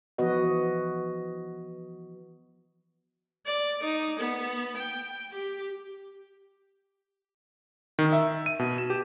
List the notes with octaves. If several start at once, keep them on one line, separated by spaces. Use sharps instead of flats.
E3 F3 B3 F#4 B4 D#5
D5
D#4
B3
G5
G4
D#3
E5
D#7
B2
E7
G4